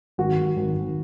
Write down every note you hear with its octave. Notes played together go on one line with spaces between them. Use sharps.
G#1 F#4
G#1
G#1
G#1